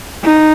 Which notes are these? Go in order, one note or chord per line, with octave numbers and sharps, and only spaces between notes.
D#4